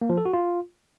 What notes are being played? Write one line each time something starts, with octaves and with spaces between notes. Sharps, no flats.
A#3
F3
A4
F#4
F4